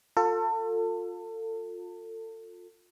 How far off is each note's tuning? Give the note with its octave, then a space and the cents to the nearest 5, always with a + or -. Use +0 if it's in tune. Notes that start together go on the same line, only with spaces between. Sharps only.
F4 +30 A4 +30